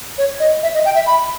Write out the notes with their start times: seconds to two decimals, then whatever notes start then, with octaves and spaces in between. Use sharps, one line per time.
0.18 C#5
0.40 D#5
0.63 E5
0.74 D#5
0.85 G5
0.95 E5
1.06 B5